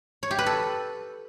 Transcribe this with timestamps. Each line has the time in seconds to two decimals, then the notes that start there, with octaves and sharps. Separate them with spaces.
0.23 C#5
0.31 G4
0.39 B4
0.47 A4